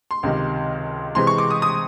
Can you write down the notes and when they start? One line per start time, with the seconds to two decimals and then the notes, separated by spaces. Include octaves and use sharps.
0.11 C6
0.23 C#2 C3 D#3
1.15 C3 E3 G#3 C4 C6
1.27 C#6
1.38 D6
1.51 D#6
1.62 D#6